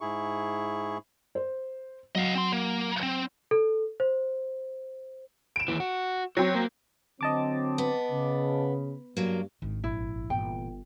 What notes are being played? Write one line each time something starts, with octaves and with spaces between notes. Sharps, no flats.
G#2 E4 G#4 C#6
C5
F#3 D#5 F5
C4 C6
A#3
C4
A4
C5
D7 E7
D#2 E3
F#4
F#3 C4 C#5
A#3
D3 F#3 C4 D#5 A5 D6
B3
C#3
G2 F#3 A#3
G#1 D#3 D4
A#1 E4
G1 A#2 E3 G5